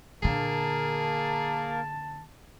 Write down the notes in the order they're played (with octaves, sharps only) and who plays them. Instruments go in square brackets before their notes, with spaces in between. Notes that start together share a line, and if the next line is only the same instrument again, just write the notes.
[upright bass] A#2 D3 [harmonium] A#3 A#4 [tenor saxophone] G#4 [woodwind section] A5